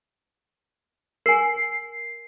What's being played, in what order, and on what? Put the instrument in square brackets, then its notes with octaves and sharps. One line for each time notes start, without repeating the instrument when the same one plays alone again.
[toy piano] A#4 G#5 [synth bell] C7